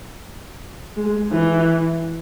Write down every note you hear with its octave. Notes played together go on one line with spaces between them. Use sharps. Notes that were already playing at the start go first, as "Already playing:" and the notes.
G#3
E3